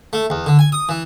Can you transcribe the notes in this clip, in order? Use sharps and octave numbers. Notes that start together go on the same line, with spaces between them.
A3
E2
D3
G#5
D#6
E3